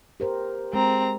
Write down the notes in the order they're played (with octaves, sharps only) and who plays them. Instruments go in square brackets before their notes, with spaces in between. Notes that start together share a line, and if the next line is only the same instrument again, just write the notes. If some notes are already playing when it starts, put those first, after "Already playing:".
[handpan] G4 A#4 C5
[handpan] G#3 [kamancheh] C4 A#5